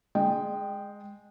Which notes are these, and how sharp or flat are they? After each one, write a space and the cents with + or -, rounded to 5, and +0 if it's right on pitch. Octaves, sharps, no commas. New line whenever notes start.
G#3 +0 D#5 -35 G5 +0